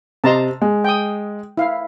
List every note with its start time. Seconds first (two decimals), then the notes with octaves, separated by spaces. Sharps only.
0.24 C3 D#5 A5 A#5 C6
0.62 G#3
0.84 G5 D#6
1.57 E4 F5